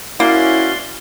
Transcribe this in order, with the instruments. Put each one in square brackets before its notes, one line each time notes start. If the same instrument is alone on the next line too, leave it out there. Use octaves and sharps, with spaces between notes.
[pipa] A#3 [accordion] C#4 F#4 [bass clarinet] E4 [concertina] D5 C6